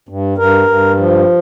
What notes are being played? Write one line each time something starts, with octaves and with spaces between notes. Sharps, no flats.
G2
G2 A#4
G2
F3